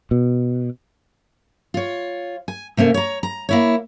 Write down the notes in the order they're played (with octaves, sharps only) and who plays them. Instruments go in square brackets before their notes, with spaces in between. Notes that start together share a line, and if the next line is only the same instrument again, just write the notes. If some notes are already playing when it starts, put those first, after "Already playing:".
[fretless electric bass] B2
[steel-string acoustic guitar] F4 C#5
G#5
C3 A3 A#3 C#4
C#5 A#5
A#5
A#3 E4 C#5